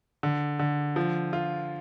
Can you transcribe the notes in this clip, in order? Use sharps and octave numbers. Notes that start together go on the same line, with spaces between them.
D3
D3
F3
F4